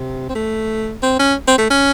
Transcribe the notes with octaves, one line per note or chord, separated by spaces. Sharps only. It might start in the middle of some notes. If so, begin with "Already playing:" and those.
Already playing: C3
C4
A3
C4
C#4
C4
A3
C#4